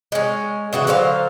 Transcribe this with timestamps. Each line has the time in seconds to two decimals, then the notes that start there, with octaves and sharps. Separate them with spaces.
0.12 G#3 C#4
0.73 C#3 E3 F#4
0.87 D3 F#3 C5 F5